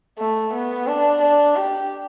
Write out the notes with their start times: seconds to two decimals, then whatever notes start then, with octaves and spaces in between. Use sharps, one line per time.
0.18 A3
0.53 B3
0.87 D4
1.22 D4
1.56 G4